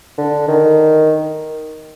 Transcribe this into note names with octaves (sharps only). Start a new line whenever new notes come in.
D3
D#3